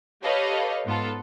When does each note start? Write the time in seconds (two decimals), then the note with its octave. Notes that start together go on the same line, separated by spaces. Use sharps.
0.22 G4 A4 B4 C#5 D#5 F5
0.85 G#2 B3 F4 A4